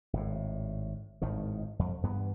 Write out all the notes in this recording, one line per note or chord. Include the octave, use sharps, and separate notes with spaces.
G#1 A2
G#1 A2 D#3
F2
G2 E3 B3